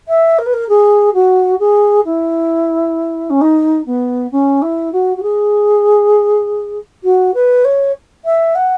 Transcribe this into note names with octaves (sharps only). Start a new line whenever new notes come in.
E5
A#4
B4
A#4
G#4
F#4
G#4
E4
C#4
D#4
B3
C#4
E4
F#4
F#4
G#4
F#4
B4
C#5
E5
F#5